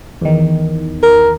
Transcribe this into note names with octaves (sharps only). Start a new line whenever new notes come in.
E2 D#3
A#4